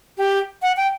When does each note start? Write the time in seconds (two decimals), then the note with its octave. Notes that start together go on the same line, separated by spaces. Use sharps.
0.18 G4
0.62 F#5
0.77 G5